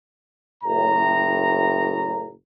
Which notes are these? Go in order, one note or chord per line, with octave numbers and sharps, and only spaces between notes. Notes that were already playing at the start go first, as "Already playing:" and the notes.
F#1 A2 A#5